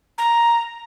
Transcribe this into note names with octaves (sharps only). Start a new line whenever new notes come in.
A#5